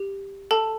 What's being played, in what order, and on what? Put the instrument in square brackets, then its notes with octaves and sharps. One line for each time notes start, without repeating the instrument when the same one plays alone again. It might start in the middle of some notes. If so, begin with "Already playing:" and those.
Already playing: [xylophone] G4
A4 A5